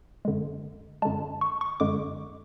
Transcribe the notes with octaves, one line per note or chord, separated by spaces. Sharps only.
F#2 D3 G#3
F#2 D3 G#3 A5
C#6
C#6
F#2 D3 G#3 D6